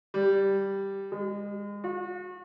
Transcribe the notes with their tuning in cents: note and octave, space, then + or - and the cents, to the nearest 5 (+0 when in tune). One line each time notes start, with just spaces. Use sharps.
G3 +0
G#3 -30
F#4 -35